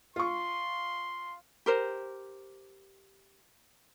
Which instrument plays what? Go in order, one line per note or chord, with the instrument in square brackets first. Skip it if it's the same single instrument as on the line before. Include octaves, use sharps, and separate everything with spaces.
[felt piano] F4 C#6 [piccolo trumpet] C6
[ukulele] G4 A#4 C5